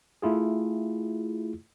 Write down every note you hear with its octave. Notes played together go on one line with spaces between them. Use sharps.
A3 E4 F4 G#4